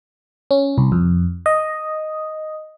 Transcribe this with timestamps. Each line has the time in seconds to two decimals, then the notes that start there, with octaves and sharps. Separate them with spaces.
0.51 C#4
0.78 C2
0.92 F2
1.46 D#5